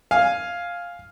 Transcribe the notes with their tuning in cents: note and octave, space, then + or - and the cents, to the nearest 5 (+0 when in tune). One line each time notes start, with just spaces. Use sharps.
F5 +0 G#5 +0